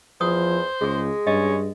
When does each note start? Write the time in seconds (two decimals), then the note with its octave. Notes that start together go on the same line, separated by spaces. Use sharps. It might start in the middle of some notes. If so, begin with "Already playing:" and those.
0.21 E2 F3 C5 D#6
0.81 C#2 G#3 G#4 C#6
1.27 G2 C#4 D#5